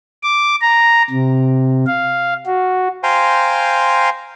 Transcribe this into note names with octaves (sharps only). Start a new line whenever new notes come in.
D6
A#5
C3
F5
F#4
C5 F5 G5 G#5 A#5 C6